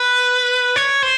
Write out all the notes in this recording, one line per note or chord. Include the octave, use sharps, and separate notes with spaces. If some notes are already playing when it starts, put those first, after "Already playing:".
Already playing: B4
C#5
C5